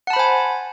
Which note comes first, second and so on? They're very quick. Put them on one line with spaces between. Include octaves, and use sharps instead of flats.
F#5 A5 B5 C5 G#5